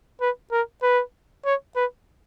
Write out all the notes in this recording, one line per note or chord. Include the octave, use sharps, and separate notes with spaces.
B4
A#4
B4
C#5
B4